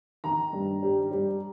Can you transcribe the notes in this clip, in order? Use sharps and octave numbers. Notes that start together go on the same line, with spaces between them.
D#3 A#5
G2
G3
G3